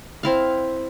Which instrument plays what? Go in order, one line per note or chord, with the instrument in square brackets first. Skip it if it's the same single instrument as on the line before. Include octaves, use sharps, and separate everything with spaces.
[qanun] C4 E4 F5